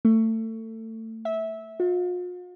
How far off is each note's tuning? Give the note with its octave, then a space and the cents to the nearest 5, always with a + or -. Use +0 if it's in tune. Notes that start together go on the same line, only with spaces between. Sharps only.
A3 +25
E5 -15
F4 +45